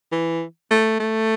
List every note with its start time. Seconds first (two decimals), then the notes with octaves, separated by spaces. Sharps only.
0.12 E3
0.71 A3
1.00 A3